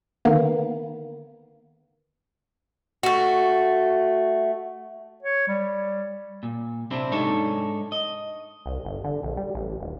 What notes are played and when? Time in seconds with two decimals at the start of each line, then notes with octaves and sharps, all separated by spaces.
0.25 D3 D#3 A#3 B3
3.03 A3 F#4
5.23 C#5
5.47 G3
6.43 A#2
6.91 C3 C4 D4 E4
7.12 G#2 D4 D#4 A4 C#5
7.92 D#5
8.66 C2
8.85 G1
9.04 D3
9.23 A#1
9.37 G3
9.55 A1
9.80 D#1